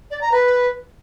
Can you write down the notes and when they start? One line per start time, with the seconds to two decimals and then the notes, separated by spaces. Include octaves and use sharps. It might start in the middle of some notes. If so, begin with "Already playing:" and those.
0.11 D5
0.21 A#5
0.32 B4